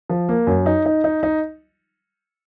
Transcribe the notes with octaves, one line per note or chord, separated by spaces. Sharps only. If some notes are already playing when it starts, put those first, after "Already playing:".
F3
A#3
F#2
D#4
D#4
D#4
D#4